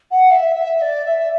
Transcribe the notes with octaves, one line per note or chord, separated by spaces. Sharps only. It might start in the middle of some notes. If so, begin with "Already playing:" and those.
F#5
E5
E5
D5
E5